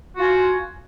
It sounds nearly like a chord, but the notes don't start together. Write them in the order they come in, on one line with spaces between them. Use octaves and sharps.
F#4 F4 G#5